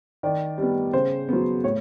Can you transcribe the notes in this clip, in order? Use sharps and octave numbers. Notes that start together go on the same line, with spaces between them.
D#3 D5
G3 B3
C#3 C5
F#3 B3
A2 C#5